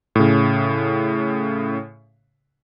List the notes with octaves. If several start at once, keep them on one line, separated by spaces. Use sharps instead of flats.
A2 C#3